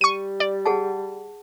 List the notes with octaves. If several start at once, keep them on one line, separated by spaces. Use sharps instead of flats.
G3 C#6 D#7
D5
G#4 F#5 A5